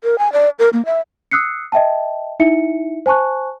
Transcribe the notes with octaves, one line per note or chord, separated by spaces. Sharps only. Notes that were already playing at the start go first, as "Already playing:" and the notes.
A#4
G#5
D5
A#4
A#3
E5
D#6 E6 F#6 C7 C#7
D#5 E5 G5 A5
D#4 E4 E5 C#7
C5 G#5 A5 C#6 F#6